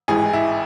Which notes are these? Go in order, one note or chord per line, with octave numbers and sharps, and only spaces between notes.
A1 G#2 E3 G#4
E4